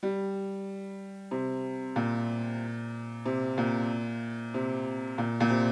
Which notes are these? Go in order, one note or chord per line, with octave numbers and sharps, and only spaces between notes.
G3
C3
A#2
C3
A#2
C3
A#2
A#2
C3